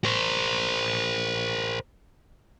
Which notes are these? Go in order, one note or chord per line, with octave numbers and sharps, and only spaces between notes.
A#4 C5